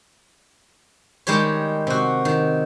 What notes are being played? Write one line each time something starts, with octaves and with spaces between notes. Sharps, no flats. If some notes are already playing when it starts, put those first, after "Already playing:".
D#3 G3 G#3 G4 C#5
C3 F#4
D#3